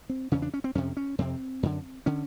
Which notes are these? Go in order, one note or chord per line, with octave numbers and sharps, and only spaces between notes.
C4
E2 C#3 C#4
D4
C#4
C4
F2 C3 C#4
C#4
F2 C3 C4
F#2 D3
D3 C#4